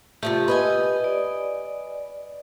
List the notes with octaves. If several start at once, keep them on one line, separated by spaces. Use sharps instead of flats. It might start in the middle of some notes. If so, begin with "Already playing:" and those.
C3 F3 A3 G4
B4 D#5 G#5
D5